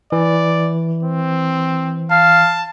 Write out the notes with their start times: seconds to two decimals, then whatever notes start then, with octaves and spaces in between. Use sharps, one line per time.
0.12 E3 D5
1.03 C4
2.11 F5 A5